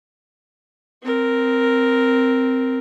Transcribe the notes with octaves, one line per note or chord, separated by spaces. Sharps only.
C4 A#4